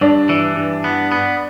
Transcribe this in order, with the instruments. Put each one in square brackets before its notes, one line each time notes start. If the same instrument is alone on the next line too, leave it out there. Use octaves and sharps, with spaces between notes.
[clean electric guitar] G2 [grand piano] D4
[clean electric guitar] E3
G2
B3
B3